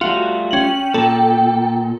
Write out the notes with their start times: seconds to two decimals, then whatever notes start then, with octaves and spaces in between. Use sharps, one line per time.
0.01 G3 A3 F4 F#4
0.51 C#4 G5 F#7
0.94 A#2 A4